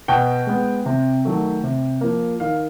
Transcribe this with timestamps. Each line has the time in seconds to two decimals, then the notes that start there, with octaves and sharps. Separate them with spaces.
0.08 B2 G5
0.47 G#3 B3
0.86 C3
1.25 D#3 F#3 A3
1.63 C3
2.01 F3 A#3
2.40 D#3 F5